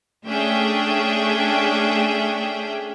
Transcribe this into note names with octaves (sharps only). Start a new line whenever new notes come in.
A3 C#4 D4 G#4 E5 G5